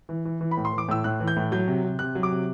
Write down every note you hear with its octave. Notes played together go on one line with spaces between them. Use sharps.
E3
E3
E3
B5
A2
C6
E3
D6
A2 E6
A2 F#6
E3
G6
A2
F#3 G6
C3
C3
C3 F#6
F#3
D6
C3